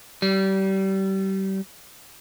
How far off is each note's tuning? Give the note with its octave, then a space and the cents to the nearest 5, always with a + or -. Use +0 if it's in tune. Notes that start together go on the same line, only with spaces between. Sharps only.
G3 -30